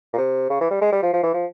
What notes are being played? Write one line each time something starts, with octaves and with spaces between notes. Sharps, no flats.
A#2
C3
C#3
E3
G3
G#3
G3
F3
F3
E3
F3